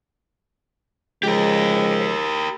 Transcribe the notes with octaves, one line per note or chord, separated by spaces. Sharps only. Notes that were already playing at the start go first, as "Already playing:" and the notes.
C#3 F3 G#3 G4 A#4